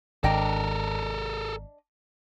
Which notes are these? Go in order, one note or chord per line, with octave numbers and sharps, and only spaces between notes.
G#1 D4 A4 A#4 D#5 G5